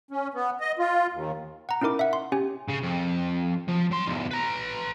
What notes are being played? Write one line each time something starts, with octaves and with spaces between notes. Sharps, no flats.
C#4
B3
D#5
F4
D#2
F#5 A#5
C#4 D#4 E4 A#4 D6
E5 F#5
C6
C#4 G4 G#5
C#3
F2
F3
F#3 C6
B1 E2
B4 A#5